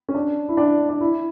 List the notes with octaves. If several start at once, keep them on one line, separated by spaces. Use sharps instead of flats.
C#4
D4
E4
D4
D4
E4